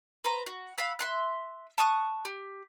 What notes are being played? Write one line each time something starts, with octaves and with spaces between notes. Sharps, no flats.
B4 C5 A#5
F#4
F5 F#5 B5 E6
E5 C6 F#6
A5 C#6 D#6 F#6
G4